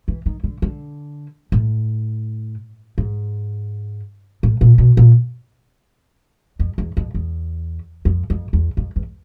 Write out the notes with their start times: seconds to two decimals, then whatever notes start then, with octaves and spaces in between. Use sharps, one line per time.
0.08 E3
0.26 D#3
0.44 D3
0.62 D3
1.52 A2
2.98 G#2
4.43 A2
4.61 A#2
4.78 B2
4.97 A#2
6.60 F2
6.78 E2
6.97 F2
7.14 E2
8.05 F2
8.30 F2
8.53 E2
8.77 F2
8.96 E2